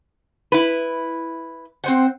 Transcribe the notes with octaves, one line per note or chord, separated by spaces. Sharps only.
E4 B4
C4 C5 F#5